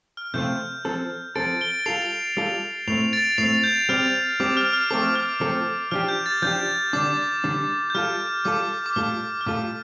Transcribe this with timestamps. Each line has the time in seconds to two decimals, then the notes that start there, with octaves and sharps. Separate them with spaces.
0.17 F6
0.34 C3 F3 A3 C4 F4 G6
0.85 F3 C4 A4
1.35 F3 C4 A4 A6 D7
1.61 D7 G7
1.86 G3 F4 A4 C7 F7
2.37 G3 F4 A4
2.88 A2 A3 C4 C7 F7
3.13 A6 D7
3.38 A2 A3 C4 C7 F7
3.64 G6
3.89 G3 C4 G4 F6
4.40 G3 C4 G4 D6
4.57 F6
4.73 F6
4.90 F3 A3 C4 A4 D6
5.16 F6
5.41 F3 A3 C4 A4
5.91 F3 D4 G4 F6
6.08 G6
6.26 A6
6.42 F3 D4 G4 G6
6.93 D3 G3 D4 D6
7.44 D3 G3 D4
7.90 G6
7.95 G3 F4 A4 F6
8.45 G3 F4 A4 D6
8.86 D6
8.96 A2 G3 F4 A4 F6
9.41 F6
9.46 A2 G3 F4 A4 D6